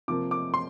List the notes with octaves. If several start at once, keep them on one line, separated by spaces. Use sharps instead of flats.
C3 F3 A#3 D6
D6
C6